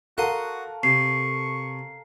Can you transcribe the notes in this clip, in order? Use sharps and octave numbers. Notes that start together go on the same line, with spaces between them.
F#4 A4 A#4 F5 F#5 C6 D#6
C3 C#6 C7